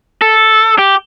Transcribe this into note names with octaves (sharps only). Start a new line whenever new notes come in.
A4
G4